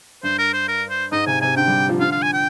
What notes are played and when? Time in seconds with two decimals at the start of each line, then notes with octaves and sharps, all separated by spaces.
0.23 G2 C5
0.38 A#4
0.53 C5
0.68 A#4
0.90 C5
1.12 G#2 D#5
1.27 C3 G#5
1.41 C3 G#5
1.56 D3 G5
1.68 G3
1.89 F3
2.00 D3 F5
2.12 F5
2.22 G#5
2.33 G5